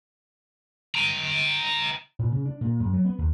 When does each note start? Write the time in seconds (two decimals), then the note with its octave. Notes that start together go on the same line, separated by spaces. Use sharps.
0.95 G5 A#5
2.19 A#2
2.32 C#3
2.46 D4
2.61 A#2
2.80 F#2
2.93 F#3
3.05 B3
3.18 D#2